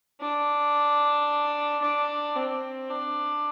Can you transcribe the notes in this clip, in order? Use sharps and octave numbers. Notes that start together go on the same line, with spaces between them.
D4
D4
C4
D4